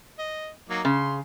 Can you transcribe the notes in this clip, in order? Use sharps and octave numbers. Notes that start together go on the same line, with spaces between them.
D#5
F#3 A#3 D#4
C#3 C6